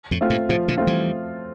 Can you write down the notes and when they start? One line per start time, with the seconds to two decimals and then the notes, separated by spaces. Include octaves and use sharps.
0.11 F2 A2
0.21 A3 C4 F4
0.30 G2 A#2
0.49 A2 C3 F3
0.68 A#2 D3
0.78 A3 C4 F4
0.87 E3 G3